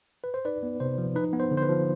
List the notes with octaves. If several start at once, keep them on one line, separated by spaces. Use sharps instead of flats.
B4
C5
D#4 B4 D5
B3
C3 C5
F3
D#4 B4
B3
C5
D3
C5
B4
F3